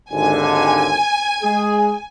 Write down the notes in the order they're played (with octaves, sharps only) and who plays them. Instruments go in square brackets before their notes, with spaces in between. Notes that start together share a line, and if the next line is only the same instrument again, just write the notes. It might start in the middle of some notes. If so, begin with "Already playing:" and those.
[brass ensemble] G#1 D#2 D3 [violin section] G#5
[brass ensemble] G#3 G#4